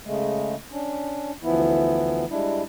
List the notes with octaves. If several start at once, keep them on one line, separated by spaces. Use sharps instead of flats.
C#3 G#3 A3
C#4 D4
D2 E3 F3 B3 E4
G3 G#3 D4 E4